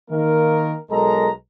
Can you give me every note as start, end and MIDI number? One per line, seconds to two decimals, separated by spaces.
0.10 0.77 51
0.10 0.77 58
0.10 0.77 70
0.91 1.30 35
0.91 1.30 56
0.91 1.30 69
0.91 1.30 70
0.91 1.30 82